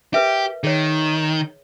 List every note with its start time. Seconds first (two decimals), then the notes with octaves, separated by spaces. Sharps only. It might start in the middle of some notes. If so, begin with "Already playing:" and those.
0.14 G4 A#4 B4 E5
0.64 D#3 G#4 C#5